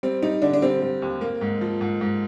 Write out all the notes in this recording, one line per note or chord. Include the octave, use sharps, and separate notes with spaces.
G3 C4
G3 D#4
D3 D4
D4
G3 C4
G3
D#2
A#3
G#2
F3
G#2
G#2